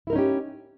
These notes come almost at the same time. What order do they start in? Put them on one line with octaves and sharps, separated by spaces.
E4 A#4 D#4 C#4 G4